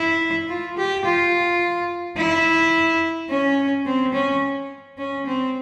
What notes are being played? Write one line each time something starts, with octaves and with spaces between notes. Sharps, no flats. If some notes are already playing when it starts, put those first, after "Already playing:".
Already playing: E4
F4
G4
F4
E4
C#4
C4
C#4
C#4
C4